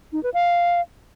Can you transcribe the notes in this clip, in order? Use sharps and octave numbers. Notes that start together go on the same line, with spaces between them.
D#4
B4
F5